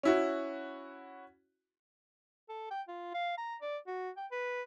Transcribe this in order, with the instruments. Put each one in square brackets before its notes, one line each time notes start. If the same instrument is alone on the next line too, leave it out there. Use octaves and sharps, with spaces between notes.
[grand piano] C#4 E4 F#4
[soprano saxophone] A4
G5
F4
F5
A#5
D5
F#4
G5
B4